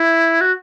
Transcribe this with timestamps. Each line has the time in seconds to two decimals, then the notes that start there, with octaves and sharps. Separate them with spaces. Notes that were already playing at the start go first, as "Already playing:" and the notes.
Already playing: E4
0.41 F#4